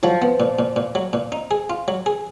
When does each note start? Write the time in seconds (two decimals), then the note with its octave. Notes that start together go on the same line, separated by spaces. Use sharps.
0.03 F3 F#3
0.22 B3
0.40 A#2
0.59 A#2
0.76 A#2
0.95 F#3
1.13 A#2
1.32 D#4
1.51 G#4
1.70 F4
1.88 F#3
2.06 G#4